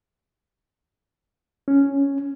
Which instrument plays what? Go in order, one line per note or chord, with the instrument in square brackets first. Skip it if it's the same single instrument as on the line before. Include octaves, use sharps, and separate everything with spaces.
[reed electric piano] C#4